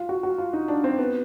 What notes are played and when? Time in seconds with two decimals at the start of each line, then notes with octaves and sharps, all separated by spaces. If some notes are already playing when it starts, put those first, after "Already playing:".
Already playing: F4
0.09 F#4
0.23 F#4
0.38 F4
0.53 D#4
0.68 D4
0.84 C4
0.99 B3